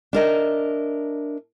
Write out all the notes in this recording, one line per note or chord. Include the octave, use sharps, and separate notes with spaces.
D4 A#4 D#5 E5